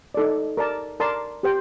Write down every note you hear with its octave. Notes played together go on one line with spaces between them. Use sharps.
D#4 A4 D5
A#4 D5 A5
A#4 D5 A5 C6
G4 C5 G5